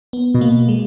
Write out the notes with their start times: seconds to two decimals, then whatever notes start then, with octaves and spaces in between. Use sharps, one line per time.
0.13 B3
0.34 B2
0.41 A#3
0.69 G#3